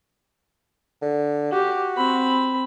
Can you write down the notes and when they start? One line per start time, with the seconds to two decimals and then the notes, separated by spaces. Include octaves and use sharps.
1.02 D3
1.52 F#4 G4
1.97 C4 B5